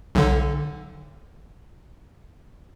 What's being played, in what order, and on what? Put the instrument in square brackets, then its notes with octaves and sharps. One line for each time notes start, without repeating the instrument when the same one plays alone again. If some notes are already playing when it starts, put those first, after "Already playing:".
[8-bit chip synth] B1 D3